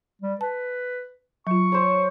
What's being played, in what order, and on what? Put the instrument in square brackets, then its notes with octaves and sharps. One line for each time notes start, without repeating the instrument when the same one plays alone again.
[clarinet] G3
[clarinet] B4 [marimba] A5
[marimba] F#3 F4 [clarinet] C#6
[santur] C5 C#5